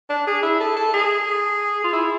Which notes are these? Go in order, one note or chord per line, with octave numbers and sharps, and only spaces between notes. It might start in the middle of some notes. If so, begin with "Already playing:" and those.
D4
G#4
E4
A4
A4
G#4
F4
E4